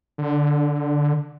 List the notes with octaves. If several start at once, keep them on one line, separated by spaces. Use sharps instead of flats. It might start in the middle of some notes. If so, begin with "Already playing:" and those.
D3